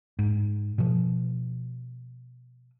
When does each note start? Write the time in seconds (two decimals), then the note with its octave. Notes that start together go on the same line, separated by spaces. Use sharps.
0.19 G#2
0.78 B2 F3